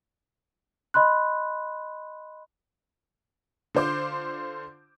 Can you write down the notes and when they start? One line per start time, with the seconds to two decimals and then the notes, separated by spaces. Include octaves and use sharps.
0.94 D#5 B5 C6 F#6
3.75 D3 F4 C5 D6 G6